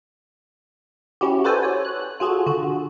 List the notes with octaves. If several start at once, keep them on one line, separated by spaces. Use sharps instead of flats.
C#4 E4 F#4 G4
F#4 A4 B4 C5 D5 G#5
C#5
F#6
F4 F#4 G#4 A4
D3 F#4